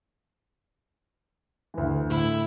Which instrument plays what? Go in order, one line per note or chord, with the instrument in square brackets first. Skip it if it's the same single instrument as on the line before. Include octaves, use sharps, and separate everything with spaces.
[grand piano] D2 E3
[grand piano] A2 [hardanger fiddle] E4